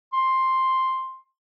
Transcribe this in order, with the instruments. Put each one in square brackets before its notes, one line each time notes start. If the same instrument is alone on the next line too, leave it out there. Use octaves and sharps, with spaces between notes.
[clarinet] C6